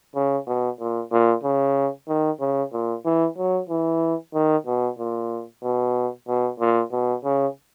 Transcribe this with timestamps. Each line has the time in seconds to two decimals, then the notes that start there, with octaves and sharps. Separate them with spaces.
0.15 C#3
0.47 B2
0.80 A#2
1.12 A#2
1.44 C#3
2.08 D#3
2.40 C#3
2.73 A#2
3.05 E3
3.37 F#3
3.70 E3
4.34 D#3
4.66 B2
4.98 A#2
5.63 B2
6.28 B2
6.59 A#2
6.92 B2
7.24 C#3